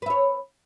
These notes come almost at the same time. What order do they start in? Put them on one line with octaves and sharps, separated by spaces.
B4 E5 C#5